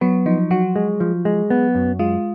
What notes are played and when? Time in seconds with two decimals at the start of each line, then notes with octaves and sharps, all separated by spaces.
0.01 F#3 B3
0.26 F3 D#4
0.51 F#3 F#4
0.76 G#3
1.00 F3
1.25 G#3
1.50 B3
1.75 F#2
1.99 G#3 F4